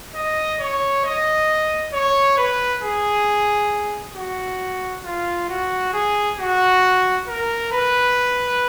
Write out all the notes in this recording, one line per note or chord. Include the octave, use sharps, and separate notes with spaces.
D#5
C#5
D#5
C#5
B4
G#4
F#4
F4
F#4
G#4
F#4
A#4
B4